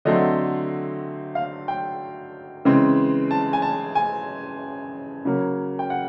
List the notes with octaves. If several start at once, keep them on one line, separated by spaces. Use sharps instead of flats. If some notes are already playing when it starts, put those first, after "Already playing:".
D3 F#3 A3 C4 D#5
F5
G5
C#3 E3 G#3 C4
A5
G#5
A5
G#5
C#3 F#3 A#3 C#4
G5
F#5